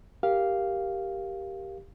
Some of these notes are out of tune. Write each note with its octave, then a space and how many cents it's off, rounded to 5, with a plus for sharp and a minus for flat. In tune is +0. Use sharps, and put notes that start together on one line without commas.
G4 +0 A#4 +0 F5 +0